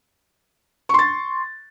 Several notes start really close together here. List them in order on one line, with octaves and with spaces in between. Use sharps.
C#6 C6 A6